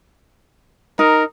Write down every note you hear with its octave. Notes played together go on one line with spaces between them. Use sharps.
D#4 A#4